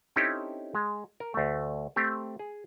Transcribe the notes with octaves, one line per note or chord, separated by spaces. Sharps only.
C4 C#4 D#4 E4 G4 A4
G#3
A#4
D2 A3
A3 C4 G4
G#4